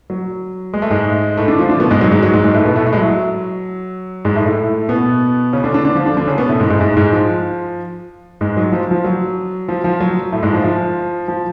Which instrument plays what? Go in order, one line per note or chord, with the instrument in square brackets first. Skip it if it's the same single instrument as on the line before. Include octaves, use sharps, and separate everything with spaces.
[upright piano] F#3
G#3
A3
G#2 G#3
A2 A3
D3 D4
F3 F4
D3 D4
B2 B3
G#2 G#3
F#3
G#2 G#3
F#3
G#2 G#3
G#2 G#3
A2 A3
B2 B3
A2 A3
A2 A3
G#3
F#3
G#2 G#3
A2 A3
A2 A3
B2 B3
C#3 C#4
D3 D4
D3 D4
D3 D4
F3 F4
D3 D4
D3 D4
C#3 C#4
B2 B3
A2 A3
G#2 G#3
G#2 G#3
G#2 G#3
G#2 G#3
F3
G#2 G#3
F#3
F3
F3
F#3
F3
F3
F#3
A2 A3
G#2 G#3
F3
F3
F3